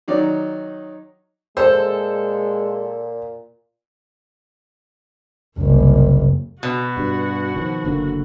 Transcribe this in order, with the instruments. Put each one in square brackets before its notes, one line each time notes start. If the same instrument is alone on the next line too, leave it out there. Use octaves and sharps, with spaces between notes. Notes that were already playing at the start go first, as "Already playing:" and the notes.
[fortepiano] D#3 F#3 D#4 D5
[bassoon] A#2 [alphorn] G#3 [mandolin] A4 E6 [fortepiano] C5
[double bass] F#1 C2
[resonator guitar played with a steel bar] B2 [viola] F#4
[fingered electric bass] G2
D#3 F3
F#1 D3 A#3